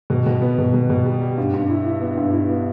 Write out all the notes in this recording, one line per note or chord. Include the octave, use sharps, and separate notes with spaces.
B2
B2
B3
B2
B2
B2
G3
G3
G2
G2
E4
E4
B3
G2
E4
B3